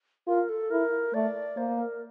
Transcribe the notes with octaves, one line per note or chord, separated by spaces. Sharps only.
F4 A#4
A4
E4 A#4
A3 D5
A#3 C5
A#4